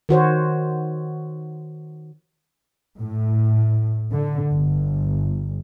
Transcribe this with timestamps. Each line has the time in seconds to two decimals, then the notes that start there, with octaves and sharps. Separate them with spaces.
0.09 D#3 F#4 C5 C#5
2.99 A2
4.12 D3
4.52 G1